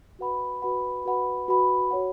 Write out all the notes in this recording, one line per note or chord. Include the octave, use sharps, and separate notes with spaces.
F#4 B4 F#5 B5
F#4 B4 F#5 B5
F#4 B4 F#5 B5
F#4 B4 F#5 B5
F#4 C#5 F#5